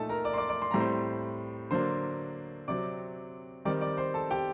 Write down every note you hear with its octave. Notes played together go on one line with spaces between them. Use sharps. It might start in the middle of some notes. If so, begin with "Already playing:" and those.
Already playing: A#2 A3 D#4 A4 A5
A#4 A#5
D5 D6
C6
D5 D6
D5 D6
C6
A2 G3 C4 A#5
C5 C6
D3 F#3 A#3 D4 C5 C6
C3 F#3 C4 D5 D6
D#3 G3 C4 D#4 D5 D6
D5 D6
C5 C6
A4 A5
G4 G5